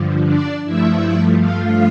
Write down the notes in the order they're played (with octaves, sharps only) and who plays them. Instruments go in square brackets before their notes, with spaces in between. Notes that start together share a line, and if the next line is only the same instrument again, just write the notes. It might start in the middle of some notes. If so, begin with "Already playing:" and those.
Already playing: [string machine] G2 D3 F3
D4 D5
G2 F3 A3 E4 E5
F4 F5